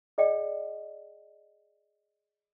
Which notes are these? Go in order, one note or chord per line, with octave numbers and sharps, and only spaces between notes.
G#4 D5 D#5 G5